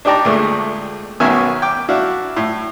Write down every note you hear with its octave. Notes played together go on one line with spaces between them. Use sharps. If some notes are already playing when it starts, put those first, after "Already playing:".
D4 D#4 G4 D5 A5 A#5
D2 A#2 G#3 A3
B1 B2 D#3 C#4 E5 G#5
G5 D6
D4 E4 F#4 F5
A2